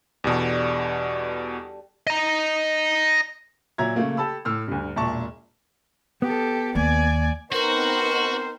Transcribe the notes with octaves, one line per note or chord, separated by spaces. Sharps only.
E2 B2 G3 D4 A4
D#5 A#5
A#2 F#3 E5 A#5 G#6
C#3 F#3 A3 A#3
G4 A4 A5 B5 E6
A2 E6 F6
D2 G2
E1 A#2 E5 A5 C#6
B3 G4 A4
D#2 D5 G#5
B3 C4 D#4 F#4 A#4 C5